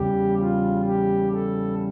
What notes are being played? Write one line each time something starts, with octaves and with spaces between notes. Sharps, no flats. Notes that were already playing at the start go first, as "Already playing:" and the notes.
Already playing: E2 C#3 G3 G4
F4
G4
A4